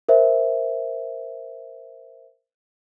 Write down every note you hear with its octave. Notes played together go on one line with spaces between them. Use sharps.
A#4 C5 E5